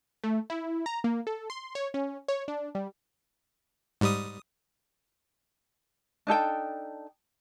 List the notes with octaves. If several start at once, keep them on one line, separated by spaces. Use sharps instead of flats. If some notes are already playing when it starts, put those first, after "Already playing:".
A3
E4
A#5
A#3
A4
C6
C#5
C#4
C#5
D4
G3
G#2 G3 D#6
D4 D#4 A4 G5